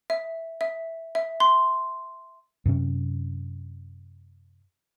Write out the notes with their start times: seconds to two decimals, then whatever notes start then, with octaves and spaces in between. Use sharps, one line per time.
0.10 E5
0.61 E5
1.15 E5
1.40 C6
2.65 F#2 C3 C#4